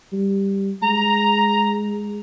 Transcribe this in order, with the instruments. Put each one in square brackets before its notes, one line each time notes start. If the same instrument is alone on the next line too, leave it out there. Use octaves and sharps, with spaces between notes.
[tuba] G3
[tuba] G#3 [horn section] A#5